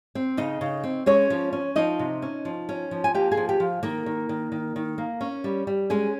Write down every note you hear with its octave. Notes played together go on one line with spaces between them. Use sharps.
C4
C#3 D#4 D#5
C#3
C4
G#3 C#4 C#5
F3
C#4
F3 D#4 D#5
C3
C#4
F3
C#4
F3
G#5
A#3 G4 G5
G#4 G#5
F3
G4 G5
F3
D#3 A#3 A#4
D#3
D#3
D#3
D#3
A#3
C#4
G3
G3
G#3 C#4 G#4